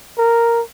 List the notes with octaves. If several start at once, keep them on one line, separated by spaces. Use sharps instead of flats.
A#4